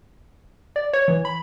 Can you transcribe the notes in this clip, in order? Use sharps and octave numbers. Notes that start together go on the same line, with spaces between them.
D5
C#5
E3
B5